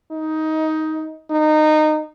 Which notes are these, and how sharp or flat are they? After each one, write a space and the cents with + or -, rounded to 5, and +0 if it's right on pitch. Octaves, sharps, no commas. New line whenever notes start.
D#4 +15
D#4 -20